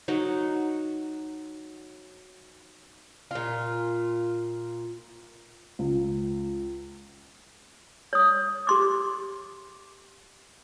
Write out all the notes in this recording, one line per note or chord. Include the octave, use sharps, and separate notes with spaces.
F#3 D#4 F#5
A#2 F4
C#2
C#5 D#6
G4 C6 D6